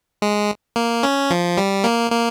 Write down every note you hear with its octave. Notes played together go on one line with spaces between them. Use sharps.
G#3
A#3
C#4
F3
G3
A#3
A#3